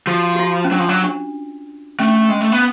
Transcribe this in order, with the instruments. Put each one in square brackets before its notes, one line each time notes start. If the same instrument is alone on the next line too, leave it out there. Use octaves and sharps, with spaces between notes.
[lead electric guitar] F3 [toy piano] F#4
[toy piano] F#4
F4
C#4
[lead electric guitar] F#3 [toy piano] D4
[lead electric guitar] F3
F#3
[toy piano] D4
[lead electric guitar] A3 [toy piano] C#4
[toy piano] D4
C#4
[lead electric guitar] G#3 [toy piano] C#4
[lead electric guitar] A3
B3